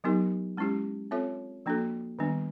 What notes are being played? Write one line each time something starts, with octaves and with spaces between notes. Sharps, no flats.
F#3 B3 D#4 G4 A#4
G#3 C#4 E4 G4
C4 F4 A4 C#5 E5
F3 A#3 D4 F#4 A4
D#3 G3 B3 D4